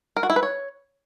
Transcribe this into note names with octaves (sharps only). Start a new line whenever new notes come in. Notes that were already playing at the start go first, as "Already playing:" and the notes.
A#4
F#4
E4
B4
C#5